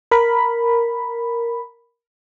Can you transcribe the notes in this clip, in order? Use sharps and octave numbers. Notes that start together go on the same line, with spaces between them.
A#4 B5